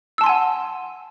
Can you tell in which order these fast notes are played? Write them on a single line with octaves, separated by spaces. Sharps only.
E6 A5 C6 G#5 F#5